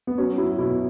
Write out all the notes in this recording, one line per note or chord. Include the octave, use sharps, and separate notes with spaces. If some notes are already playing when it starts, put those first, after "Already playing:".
B3
F#3 C#4
F#3 E4
B2 E4